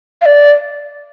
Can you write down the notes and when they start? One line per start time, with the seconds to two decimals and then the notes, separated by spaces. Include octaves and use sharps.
0.22 F5
0.26 D5